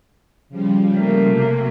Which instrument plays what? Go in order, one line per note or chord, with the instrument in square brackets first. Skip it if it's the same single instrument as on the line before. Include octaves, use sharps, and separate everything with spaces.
[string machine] C#3 F3 G3
[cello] A3 A#3
[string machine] C3 F#3